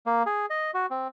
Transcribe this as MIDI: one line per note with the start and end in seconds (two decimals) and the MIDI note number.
0.06 0.23 58
0.26 0.46 68
0.50 0.71 75
0.74 0.86 66
0.90 1.08 60